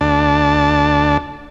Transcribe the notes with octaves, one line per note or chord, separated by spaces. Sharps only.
D2 D4 A5